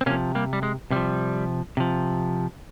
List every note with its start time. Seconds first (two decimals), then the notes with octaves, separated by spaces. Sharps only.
0.01 C4
0.06 C3 A#3 C#4
0.10 F3
0.35 G3 A#3
0.53 G3
0.63 G#3
0.91 C3 F3 G3
1.77 C3 F3